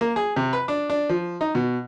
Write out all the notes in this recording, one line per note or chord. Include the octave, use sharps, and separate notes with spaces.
A#3
G#4
C3
B4
D4
D4
F3
D#4
B2